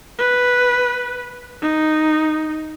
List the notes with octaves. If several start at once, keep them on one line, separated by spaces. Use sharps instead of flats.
B4
D#4